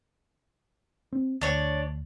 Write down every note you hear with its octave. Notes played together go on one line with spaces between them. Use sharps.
C4
D2 D4 C#5